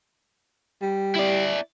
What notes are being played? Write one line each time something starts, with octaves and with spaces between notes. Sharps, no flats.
G3
E4 D5